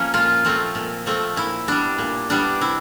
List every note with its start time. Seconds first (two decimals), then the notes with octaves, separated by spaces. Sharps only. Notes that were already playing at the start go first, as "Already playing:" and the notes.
Already playing: F3 A#3 C#4
0.14 A#2 F4
0.45 F3 A3 C4
0.75 A#2
1.06 F3 A3 C4
1.37 A#2 E4
1.68 G3 B3 D4
1.98 A#2
2.30 G3 B3 D4
2.61 C3 E4